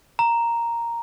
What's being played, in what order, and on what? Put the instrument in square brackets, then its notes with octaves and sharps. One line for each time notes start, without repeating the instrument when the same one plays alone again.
[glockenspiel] A#5